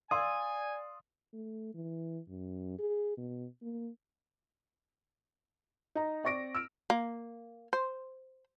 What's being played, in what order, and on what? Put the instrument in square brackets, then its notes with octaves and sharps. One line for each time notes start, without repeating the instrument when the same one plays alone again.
[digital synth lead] D5 [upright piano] F5 C6 E6 [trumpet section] G#5 [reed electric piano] D#6
[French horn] A3
E3
F#2
G#4
B2
A#3
[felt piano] D#4 A#5
C4 D5 C#6 A#6 D7
E6 F6 D7
[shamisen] A#3
C5